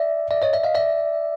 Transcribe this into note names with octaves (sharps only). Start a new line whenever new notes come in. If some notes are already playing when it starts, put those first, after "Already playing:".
Already playing: D5 E5
D5 E5
C#5 D#5
D5 E5
D#5 F5
D5 E5